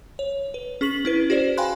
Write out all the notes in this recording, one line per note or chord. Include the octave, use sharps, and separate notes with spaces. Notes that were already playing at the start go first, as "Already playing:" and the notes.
C#5
B4
C#4 G#4 C#6 B6 F#7
C#4 E4 B4
F#4 G#4 C5 D5
F5 G5 G#5 B5 C6 F#6